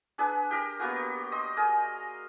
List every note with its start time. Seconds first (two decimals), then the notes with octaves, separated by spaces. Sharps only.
0.18 D4 G#4 B4
0.51 G4 A#4
0.80 A#3 B3 F#4 G4
1.32 D#5 C6
1.57 G#4 A#4 D#6